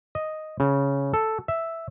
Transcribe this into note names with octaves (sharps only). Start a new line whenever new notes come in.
D#5
C#3
A4
E5